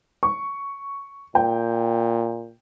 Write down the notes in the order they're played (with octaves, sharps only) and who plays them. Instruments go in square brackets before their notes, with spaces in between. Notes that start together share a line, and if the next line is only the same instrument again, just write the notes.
[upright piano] C#6
[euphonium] A#2 [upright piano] G5